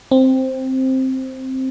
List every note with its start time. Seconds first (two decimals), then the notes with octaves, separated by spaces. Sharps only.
0.11 C4